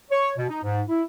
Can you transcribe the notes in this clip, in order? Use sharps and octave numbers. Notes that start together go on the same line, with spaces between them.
C#5
B2
D#4
G#2
E4